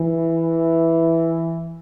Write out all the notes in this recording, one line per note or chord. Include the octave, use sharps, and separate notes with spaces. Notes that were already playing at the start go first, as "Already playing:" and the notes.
Already playing: E3